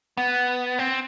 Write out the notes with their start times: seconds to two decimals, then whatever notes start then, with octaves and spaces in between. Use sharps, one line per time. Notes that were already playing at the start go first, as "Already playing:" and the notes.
0.17 B3
0.79 C4